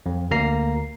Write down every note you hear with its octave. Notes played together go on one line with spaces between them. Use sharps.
F2
D2 A#3 A#5 C7